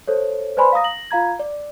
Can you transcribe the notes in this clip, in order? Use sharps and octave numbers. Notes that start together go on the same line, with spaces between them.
A4 C5 C#5
B4 C5 D5 G#5 B5 C6
F5 A#5 D#6 A#6
A#6 F#7
F4 F5 A#5 G#6
D5